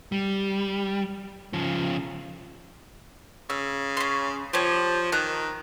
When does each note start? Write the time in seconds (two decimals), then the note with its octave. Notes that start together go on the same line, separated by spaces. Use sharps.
0.12 G3
1.53 C#3 F3
3.50 C#3 E6
3.97 C#4 C6
4.53 F3 G4 C#5
5.12 D#3 A#5 F#6